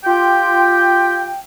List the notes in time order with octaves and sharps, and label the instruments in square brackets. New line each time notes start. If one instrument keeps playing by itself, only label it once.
[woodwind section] F4 G4 G5